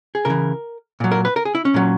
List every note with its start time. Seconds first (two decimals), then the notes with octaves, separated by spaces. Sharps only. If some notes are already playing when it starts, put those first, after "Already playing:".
0.15 G#4
0.25 C#3 E3 A#4
1.00 A#2 F#3
1.11 A#4
1.25 B4
1.36 A#4
1.45 G#4
1.55 E4
1.65 C#4
1.74 A#2 F#3